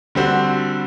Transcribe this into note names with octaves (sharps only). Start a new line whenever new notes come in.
D3 G3 C4 F#4